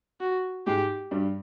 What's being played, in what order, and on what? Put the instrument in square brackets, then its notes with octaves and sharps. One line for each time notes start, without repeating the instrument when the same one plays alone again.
[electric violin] F#4
[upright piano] G#2 G#3 [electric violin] G4
[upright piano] G2 G3